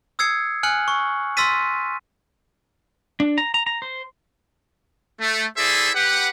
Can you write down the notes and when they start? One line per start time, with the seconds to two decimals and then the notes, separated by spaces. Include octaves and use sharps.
0.19 D#6 E6 G#6 C7 C#7
0.63 G#5 F6 F#6 C#7 F#7
0.88 C#6
1.37 C6 E6 F6 A6 B6 D#7
3.20 D4
3.38 A#5
3.54 A#5
3.67 A#5
3.82 C5
5.20 A3
5.57 E4 G#4 A4 C5 D5 E5
5.95 G4 B4 F#5